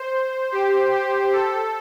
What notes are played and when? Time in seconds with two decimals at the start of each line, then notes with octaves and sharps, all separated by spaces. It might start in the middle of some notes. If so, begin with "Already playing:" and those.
Already playing: C5
0.52 G4
0.92 G4
1.33 A4